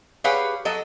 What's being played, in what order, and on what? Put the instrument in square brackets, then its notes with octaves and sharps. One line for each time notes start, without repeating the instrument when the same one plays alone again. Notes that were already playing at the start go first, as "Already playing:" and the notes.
[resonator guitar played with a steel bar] G4 G#4 B4 C#5 F5 F#5
F#3 A4 D#5